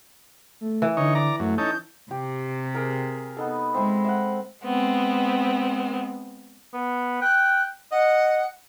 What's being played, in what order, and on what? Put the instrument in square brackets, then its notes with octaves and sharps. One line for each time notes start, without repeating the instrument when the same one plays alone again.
[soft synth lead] A3
[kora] E3
[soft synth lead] D3 [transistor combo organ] D#4 C#5
[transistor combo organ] D5 A#5
[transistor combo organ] F#2 [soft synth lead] A3
[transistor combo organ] C#4 D#4 A4 [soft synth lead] G6
[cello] C3 [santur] G4
[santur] G#4 A#4
B3 D#4 A4
[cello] G#3 [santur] C4 E5 B5
[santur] E5 F#5
[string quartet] G#3 B3 C4
[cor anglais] B3
[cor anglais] G5 [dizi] F#6
[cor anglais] D#5 [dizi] F#5